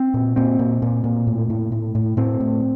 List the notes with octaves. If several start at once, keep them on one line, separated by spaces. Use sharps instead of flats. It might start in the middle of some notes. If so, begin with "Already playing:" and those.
Already playing: C4
A#2
A#2 C4
A#2
A#2
A#2
A2
A2
A2
A2
A2 C4
A2